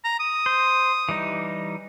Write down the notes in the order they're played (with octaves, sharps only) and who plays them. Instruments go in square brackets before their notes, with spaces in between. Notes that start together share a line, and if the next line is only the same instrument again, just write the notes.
[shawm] A#5
D#6
[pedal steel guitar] C5
E3 G3 D#4